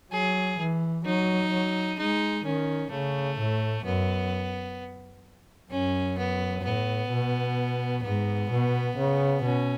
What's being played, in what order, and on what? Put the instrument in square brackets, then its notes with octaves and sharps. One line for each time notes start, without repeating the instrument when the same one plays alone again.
[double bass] F#3 [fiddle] G#4
[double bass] E3
[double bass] F#3 [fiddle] D#4
[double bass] F#3
[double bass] G#3 [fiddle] D#4
[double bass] D#3 [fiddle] C#4
[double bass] C#3 [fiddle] A3
[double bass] A2
[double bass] F#2 [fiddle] B3
[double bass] F#2 [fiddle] C#4
[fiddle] B3
[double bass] A2 [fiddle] B3
[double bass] B2
[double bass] G#2 [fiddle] B3
[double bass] B2
C#3
[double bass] B2 [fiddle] C#4